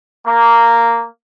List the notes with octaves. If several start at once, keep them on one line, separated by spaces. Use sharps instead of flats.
A#3